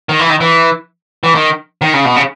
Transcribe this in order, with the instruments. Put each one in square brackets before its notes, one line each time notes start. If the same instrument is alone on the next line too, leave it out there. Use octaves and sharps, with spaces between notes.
[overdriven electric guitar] D#3
E3
D#3
E3
E3
D#3
D#3
C#3
B2
C#3